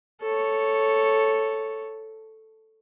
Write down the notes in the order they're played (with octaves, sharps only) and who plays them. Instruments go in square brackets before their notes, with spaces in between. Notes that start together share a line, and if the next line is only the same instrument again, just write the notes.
[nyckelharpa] A4 C#5